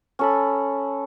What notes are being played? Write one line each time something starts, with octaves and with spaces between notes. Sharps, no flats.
C#4 A4 B5